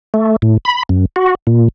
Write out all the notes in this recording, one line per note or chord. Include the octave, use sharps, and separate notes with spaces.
A3
A2
B5
F#2
F#4
A#2